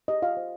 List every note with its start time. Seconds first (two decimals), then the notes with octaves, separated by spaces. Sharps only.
0.08 G4 D#5
0.22 F4 F5
0.37 C5